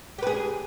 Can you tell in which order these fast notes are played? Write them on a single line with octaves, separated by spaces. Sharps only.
G4 B4 G#4